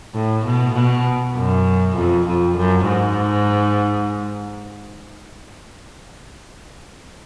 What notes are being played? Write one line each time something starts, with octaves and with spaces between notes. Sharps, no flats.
A2
B2
B2
F#2
F2
F2
F#2
G#2